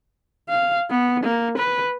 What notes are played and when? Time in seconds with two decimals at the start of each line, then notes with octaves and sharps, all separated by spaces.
0.49 F5
0.90 B3
1.24 A#3
1.58 B4